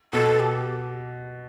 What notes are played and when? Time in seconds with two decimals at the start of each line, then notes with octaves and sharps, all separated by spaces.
0.13 B2 A4
0.40 G4